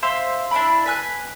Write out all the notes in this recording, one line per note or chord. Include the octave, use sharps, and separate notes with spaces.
C5 E5 F5 C6
D4 E4 D5 B5
B4 G#5 F#6